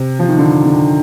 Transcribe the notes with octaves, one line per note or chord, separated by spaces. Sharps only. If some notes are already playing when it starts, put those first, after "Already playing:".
Already playing: C3
F3
D#3
D3
D3